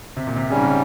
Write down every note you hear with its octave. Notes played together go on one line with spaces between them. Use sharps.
C3
A#2
C3
G#2 C#3 G3 C#4
C3